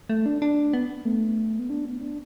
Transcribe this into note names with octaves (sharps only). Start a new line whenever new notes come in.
A3
D4
D4
B3
A3
B3
D4
B3
D4